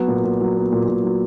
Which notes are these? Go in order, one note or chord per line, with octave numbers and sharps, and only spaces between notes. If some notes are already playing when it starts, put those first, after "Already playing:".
Already playing: F#3 B3
A#2
A#2
F#3
B3
A#2
A#2
F#3